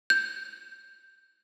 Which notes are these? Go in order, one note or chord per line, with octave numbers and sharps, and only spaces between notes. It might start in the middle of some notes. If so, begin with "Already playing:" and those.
G6